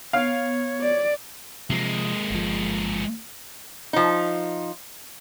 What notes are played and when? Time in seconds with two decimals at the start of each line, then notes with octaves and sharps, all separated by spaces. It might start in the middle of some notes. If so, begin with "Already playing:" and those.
0.13 B3 C#5 F5 F6
0.80 D5
1.70 C3 F3 G#3 A#3
2.30 G1 F3
3.93 F3 D#4